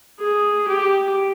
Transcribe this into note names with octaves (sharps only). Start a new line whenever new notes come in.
G#4
G4